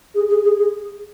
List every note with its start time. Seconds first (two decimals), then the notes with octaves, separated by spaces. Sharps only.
0.15 G#4
0.28 G#4
0.43 G#4
0.57 G#4